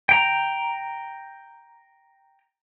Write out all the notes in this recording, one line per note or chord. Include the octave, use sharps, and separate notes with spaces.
G5 A#5